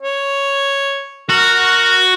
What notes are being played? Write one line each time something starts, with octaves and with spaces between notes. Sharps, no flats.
C#5
F#4 A#4